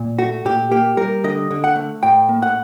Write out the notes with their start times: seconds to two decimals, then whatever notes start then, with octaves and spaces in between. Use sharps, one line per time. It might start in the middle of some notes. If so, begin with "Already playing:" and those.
Already playing: A#2
0.18 A3 F#4
0.45 A#2 G4
0.71 A#3 G4
0.97 G3 A#4
1.24 D3 D#5
1.51 D3
1.64 F#5
1.76 A3
2.03 A2 G5
2.29 A#3
2.42 F#5